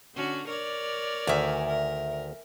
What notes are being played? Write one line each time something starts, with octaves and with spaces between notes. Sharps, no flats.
D3 C#4 F#4
A#4 C#5 D5
D2 D#3 E5 G#5
A#4